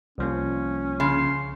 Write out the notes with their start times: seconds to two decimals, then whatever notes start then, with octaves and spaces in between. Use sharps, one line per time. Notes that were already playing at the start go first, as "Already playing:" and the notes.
0.18 C2 F3 A#3 C#4
1.00 C#3 C6